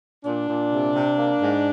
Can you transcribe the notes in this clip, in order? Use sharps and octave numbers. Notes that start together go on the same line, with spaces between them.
A#2 D4
A#2
C3
C3
A#3
G#2